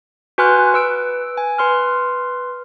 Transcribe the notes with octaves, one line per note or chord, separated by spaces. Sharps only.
F#4 B4 G#5 C6 F6 F#6
B4 E6 D7
G#5
B4 C6 F6